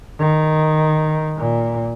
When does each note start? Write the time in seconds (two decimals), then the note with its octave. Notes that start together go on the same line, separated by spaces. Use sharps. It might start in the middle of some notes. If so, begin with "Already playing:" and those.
0.19 D#3
1.37 A#2